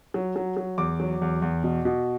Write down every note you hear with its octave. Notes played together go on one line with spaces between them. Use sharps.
F#3
F#3
F#3
E2 D6
F#3
E2
E2
B2
B2